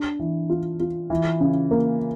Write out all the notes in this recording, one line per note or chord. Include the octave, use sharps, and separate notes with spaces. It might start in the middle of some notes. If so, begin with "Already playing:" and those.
Already playing: D4
E3
F4
F4
E3
C#3
A#3